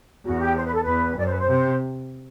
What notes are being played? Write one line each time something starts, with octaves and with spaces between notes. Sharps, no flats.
E2 F#4
G4
C5
B4
A4
E2 B4
F#2 D5
C5
B4
C5
C3